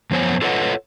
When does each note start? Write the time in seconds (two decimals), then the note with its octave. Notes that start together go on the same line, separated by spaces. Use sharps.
0.11 F#2 F3 B3 C5 C#5 G#5
0.42 F4 A4 B4 C#5 D#5 F#5